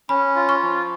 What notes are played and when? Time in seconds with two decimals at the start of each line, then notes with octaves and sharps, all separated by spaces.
0.09 C#4 B5
0.36 F4
0.49 C#6
0.63 F3